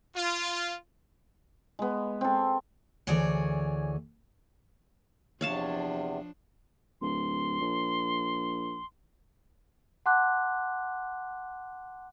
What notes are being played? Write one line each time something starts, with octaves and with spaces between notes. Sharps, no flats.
F4
G#3 B3
C4 A4
D2 E3 G#4 C#5 D5
E2 C3 F3 D4 C#5 F5 A5
D1 C6
A#1
F#5 A5 C6 D6 F#6